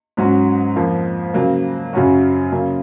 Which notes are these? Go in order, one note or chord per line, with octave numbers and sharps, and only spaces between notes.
G#2 F#3 C#4 F#4
F2 F3 A#3
C#3 F#3 A#3
F#2 C#3 F#3 C#4 F#4
C#3 F#3 A#3 C#4